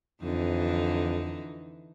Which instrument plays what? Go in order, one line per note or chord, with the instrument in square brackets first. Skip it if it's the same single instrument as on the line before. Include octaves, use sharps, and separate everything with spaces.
[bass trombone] F2 [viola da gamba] D3 E3 D#4